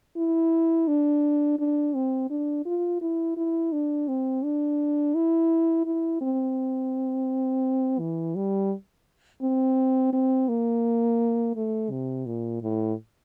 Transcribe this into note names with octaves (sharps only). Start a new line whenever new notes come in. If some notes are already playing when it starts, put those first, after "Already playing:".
E4
D4
D4
C4
D4
F4
E4
E4
D4
C4
D4
E4
E4
C4
E3
G3
C4
C4
A#3
A3
C3
A#2
A2